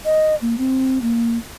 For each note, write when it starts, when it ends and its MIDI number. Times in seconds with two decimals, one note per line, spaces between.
0.05 0.35 75
0.42 0.58 58
0.58 1.01 60
1.02 1.38 58